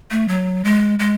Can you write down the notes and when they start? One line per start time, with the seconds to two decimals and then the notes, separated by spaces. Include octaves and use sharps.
0.11 A3
0.28 F#3
0.64 G#3
0.99 G#3